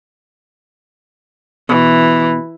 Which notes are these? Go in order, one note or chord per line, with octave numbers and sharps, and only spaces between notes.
B2 E3